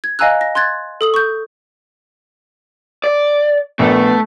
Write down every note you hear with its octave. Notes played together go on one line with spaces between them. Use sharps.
G#6
D#5 F5 G#5 A#5 E6 F#6
A#6
C6 F#6 G#6 A6
A4 D#6 F#7
C#6 G6
D5
A#1 A3 B3